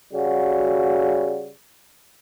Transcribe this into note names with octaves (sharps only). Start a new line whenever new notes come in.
C#3 G3 F#4